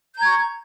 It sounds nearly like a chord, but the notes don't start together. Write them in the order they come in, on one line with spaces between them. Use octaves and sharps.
G6 A#5 G#6 C#6